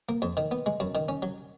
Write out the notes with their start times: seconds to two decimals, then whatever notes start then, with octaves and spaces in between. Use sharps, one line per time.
0.09 A#3
0.22 F2
0.37 D#3
0.51 B3
0.66 G#3
0.80 F#2
0.95 D#3
1.09 C#4
1.22 F#3